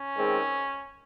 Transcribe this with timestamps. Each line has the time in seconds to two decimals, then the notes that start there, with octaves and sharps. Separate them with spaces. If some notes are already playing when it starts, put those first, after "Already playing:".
Already playing: C#4
0.17 D#3 G#3 C4